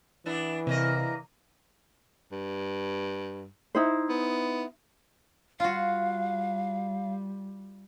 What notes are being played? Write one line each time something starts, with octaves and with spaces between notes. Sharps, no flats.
E3 B3 D4 E4
E2 C3 A#3 D#5
G2
D#4 E4 C5
B3
G3 F4 F#4 F5